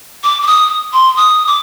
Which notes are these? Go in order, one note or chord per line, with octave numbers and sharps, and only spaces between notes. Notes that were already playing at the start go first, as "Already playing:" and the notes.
D6
D6
D#6
C6
D#6
D6